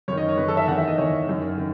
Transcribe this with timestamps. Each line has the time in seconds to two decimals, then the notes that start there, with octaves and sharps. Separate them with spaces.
0.08 F#2 C#5
0.12 D#3
0.18 D#5
0.28 C#5
0.37 F#2 D#3 B4
0.48 A4
0.57 E5
0.67 E2 F#5
0.71 D#3
0.78 E5
0.88 D#5
0.97 E2 D#3 C#5
1.27 F#2 D#3
1.58 D#3